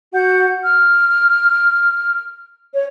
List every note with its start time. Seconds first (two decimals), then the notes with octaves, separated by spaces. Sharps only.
0.12 F#4 F#5 G6
0.63 F6
2.74 C#5